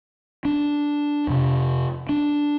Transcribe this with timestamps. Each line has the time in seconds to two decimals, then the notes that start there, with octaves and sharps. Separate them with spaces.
0.45 D4
1.27 F2 C3
2.09 D4